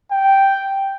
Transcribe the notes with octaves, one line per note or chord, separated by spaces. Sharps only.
G5